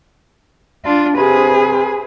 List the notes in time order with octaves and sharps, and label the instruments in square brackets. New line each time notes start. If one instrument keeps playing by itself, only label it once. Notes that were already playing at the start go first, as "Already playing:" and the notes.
[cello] D4 F4
[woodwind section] C3 [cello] G#4 B4